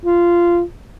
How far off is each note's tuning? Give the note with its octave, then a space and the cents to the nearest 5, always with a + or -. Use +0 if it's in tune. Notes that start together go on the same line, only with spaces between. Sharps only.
F4 -15